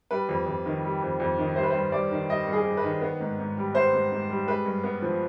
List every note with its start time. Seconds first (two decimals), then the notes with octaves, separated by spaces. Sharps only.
0.11 G3 B4
0.29 F2
0.47 F2
0.66 D#3
0.84 G3
1.02 F2
1.20 F2
1.38 D#3
1.56 G3 C5
1.63 B4
1.70 G2 C5
1.92 G2 D5
2.11 D#3
2.29 G3 D#5
2.47 G2
2.53 G#4
2.66 G2
2.77 B4
2.83 D#3
3.01 B3
3.20 G#2
3.39 G#2
3.57 G3
3.74 B3 C5
3.93 G#2
4.12 G#2
4.30 G3
4.47 G#3 B4
4.65 G2
4.84 B3
5.02 F3